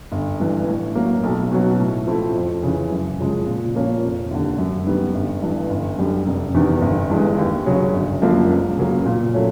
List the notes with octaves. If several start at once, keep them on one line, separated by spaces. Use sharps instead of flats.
G1
G2 E3
A2
F#3 A#3
B1
B2 F#3
A2
F3 A3 C4 E4
F2
C#3 E3
F#2
C#3 F3 G#3
A#2
F3 A#3 C#4
F1
D#2 D3
F#2
D#3 G3 B3
G1
G2 E3
G1
F#2 D3 G3
F1
E2 C3 D#3
G1
G2 E3 G#3
D#2
C#3 F#3
G1
F#2 D3 F3 A#3
C#2
C#3 F#3 A#3
A#2
F#3 A3 C#4